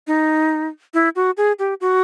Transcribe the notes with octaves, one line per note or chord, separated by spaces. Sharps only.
D#4
E4
F#4
G#4
G4
F#4